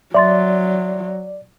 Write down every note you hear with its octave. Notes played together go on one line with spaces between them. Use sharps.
F#3 D5 E5 C6 A6